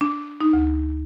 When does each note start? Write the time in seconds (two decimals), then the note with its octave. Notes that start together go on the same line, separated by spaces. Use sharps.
0.01 D4
0.41 D#4
0.53 D2